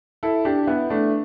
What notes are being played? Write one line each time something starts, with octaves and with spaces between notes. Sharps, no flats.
E4 A4
D4 G4
B3 E4
A3 D4